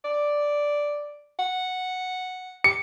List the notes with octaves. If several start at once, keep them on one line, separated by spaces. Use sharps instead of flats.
D5
F#5
G4 C#7